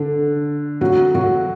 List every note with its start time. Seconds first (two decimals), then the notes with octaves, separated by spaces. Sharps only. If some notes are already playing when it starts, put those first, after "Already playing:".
Already playing: D3 D4
0.81 F#3 F#4
1.15 F#3 F#4